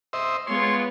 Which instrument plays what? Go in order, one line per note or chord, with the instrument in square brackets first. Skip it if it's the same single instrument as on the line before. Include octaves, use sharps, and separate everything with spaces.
[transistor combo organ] C5 D#5 E5
[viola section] G#3 B3 [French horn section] F4 C#5 [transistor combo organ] C6